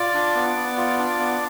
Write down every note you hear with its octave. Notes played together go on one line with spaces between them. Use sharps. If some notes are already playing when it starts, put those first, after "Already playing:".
Already playing: F4 D5 D6
D4
B3
B3
F4
D4
B3